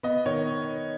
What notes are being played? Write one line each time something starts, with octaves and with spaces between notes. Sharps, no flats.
B3 D#5
D#3 C#5